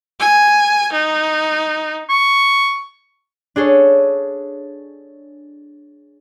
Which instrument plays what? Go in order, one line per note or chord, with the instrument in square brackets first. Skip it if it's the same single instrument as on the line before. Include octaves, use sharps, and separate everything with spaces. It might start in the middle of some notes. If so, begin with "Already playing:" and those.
[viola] G#5
D#4
[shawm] C#6
[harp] D4 G#4 A4 C#5